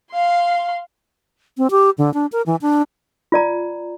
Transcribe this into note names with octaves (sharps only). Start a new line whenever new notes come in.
F5 C6
C4
G4
D3
D4
A#4
E3
D4
F4 D5 A#5